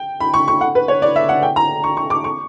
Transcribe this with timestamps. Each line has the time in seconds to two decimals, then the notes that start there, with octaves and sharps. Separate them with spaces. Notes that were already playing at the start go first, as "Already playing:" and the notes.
Already playing: G5
0.20 B5
0.34 C#6
0.48 C#6
0.61 F#5
0.75 B4
0.88 C#5
1.02 D5
1.16 E5
1.29 F#5
1.42 G5
1.56 A#5
1.84 C#6
1.97 C#6
2.10 D6
2.24 C#6